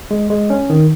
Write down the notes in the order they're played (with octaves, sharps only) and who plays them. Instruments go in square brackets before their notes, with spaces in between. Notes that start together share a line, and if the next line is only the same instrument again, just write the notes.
[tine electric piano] G#3
G#3
C#4
D#3